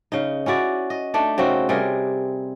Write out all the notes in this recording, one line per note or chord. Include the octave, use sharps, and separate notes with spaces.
C#3 D#4
C#4 E4 F#4 D5
D#5
A3 D4 D#4
C#3 C4 D#4 F#4
C3 G3 G#4 A#4